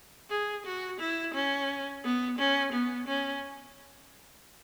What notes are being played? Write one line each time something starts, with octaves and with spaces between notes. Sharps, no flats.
G#4
F#4
E4
C#4
B3
C#4
B3
C#4